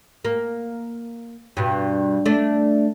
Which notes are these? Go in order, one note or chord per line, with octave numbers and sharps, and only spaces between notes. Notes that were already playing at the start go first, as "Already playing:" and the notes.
A#3
G2 B2
A3 D4